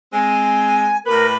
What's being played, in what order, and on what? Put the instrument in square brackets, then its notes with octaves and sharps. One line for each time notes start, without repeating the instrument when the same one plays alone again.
[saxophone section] G#3 C4 [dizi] G#5
[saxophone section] A2 G4 B4 [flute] A#4 [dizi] B5